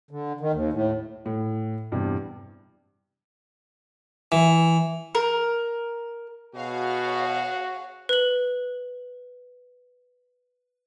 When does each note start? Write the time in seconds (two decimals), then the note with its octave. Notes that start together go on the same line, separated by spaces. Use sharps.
0.11 D3
0.41 D#3
0.53 D#2
0.73 A2
1.26 A2
1.92 E2 G2 C3
4.32 E3
5.15 A#4
6.55 B2 F#4 G#4 C#5 F5
8.09 B4 F#7